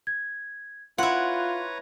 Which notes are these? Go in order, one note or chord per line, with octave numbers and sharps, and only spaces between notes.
G#6
E4 F4 B4 C#5 F#5 A#5 C6 F#6